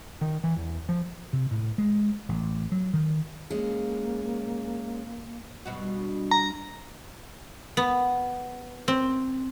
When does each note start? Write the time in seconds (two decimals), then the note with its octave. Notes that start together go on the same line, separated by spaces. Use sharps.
0.21 D#3
0.43 E3
0.57 E2
0.89 F3
1.33 C3
1.51 A2
1.78 G#3
2.29 A1
2.72 F#3
2.94 D#3
3.50 G#3 A#3 C#4
5.66 G2 B2 F#4
6.31 A#5
7.77 B3
8.88 C4